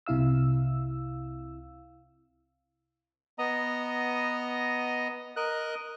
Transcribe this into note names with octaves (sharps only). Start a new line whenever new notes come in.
C2 C3 E4 F5 E6
B3 D#5 A#5
A#4 D#5 F#6